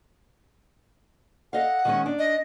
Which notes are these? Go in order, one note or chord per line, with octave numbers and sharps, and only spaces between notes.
A4 D#5 F5 F#5
D#3 G#3 C#4
D4
D#5